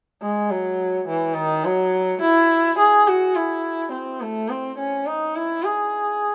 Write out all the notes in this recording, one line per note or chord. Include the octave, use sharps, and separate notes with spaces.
G#3
F#3
E3
D#3
F#3
E4
G#4
F#4
E4
C4
A3
C4
C#4
D#4
E4
G#4